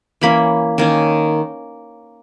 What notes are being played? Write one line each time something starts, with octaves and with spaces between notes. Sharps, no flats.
E3 A#3 C#4 B5
D#3 A#3 C#4